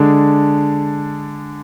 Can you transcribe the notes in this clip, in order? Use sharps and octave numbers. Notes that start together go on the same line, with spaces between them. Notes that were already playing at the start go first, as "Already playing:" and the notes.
Already playing: D3 G#3 D4